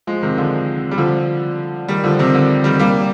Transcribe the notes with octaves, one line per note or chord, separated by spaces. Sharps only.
F3 G#3
C3 D#3
D3 F3
G3
D3 F3
D#3 G3
D3 F3
C3 D#3
D3
D#3 G3
G3 A#3